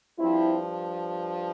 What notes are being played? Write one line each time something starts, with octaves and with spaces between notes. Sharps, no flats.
G2 F3 C4 E4